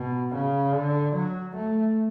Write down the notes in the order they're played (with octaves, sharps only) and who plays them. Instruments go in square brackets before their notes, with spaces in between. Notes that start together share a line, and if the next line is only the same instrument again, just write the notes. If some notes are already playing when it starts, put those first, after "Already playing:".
Already playing: [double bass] B2
C#3
D3
F#3
A3